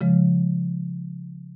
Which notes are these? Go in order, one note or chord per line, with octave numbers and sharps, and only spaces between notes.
C#3 F3 G#3